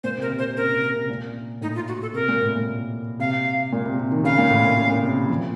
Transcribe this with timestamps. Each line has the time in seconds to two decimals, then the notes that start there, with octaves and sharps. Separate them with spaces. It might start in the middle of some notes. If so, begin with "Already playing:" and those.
0.04 A#2 C5
0.18 C3
0.22 A#4
0.30 C3
0.38 C5
0.43 C3
0.57 C#3 A#4
0.69 C3
0.83 C#3
0.96 C3
1.10 A#2
1.61 A2 D#4
1.75 F4
1.88 F#4
2.01 A4
2.14 C3 A#4
2.29 A#2
2.42 A2
2.56 A#2
3.19 C3 F5
3.73 A#2
3.86 C3
3.99 C3
4.12 D#3
4.24 C#3 F5
4.38 A#2
4.50 A2
4.65 A#2
4.78 C#3
4.90 A#2
5.03 C3
5.16 C#3
5.30 F3